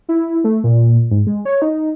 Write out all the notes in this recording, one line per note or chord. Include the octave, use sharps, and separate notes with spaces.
E4
A3
A#2
G#2
G#3
C#5
D#4